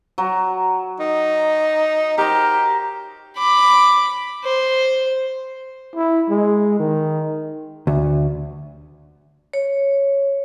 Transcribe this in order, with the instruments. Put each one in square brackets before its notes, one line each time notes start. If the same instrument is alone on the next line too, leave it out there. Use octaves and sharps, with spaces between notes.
[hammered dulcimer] F#3
[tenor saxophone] D#4
[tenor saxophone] G4 [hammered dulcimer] A#4 C5
[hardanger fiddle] B5 D6
C5
[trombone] E4
G#3
D#3
[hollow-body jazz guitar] D2
[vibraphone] C#5